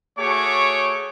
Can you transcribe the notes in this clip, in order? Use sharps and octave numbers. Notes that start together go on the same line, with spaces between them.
A3 F#4 G#4 C#5 C#6 D6